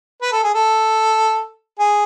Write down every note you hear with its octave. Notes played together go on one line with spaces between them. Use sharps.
B4
A4
G#4
A4
G#4